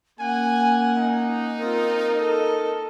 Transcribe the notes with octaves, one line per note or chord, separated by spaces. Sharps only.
A#3 C#4 F#5 G#5
D#4
C4 F4 A#4
A4 D#5